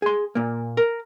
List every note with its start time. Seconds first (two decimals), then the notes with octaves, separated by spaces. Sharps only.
0.02 G#4 C6
0.35 A#2 A#3
0.77 A#4